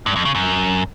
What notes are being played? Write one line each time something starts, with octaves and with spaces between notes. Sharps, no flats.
G2
F2
C#3
F#2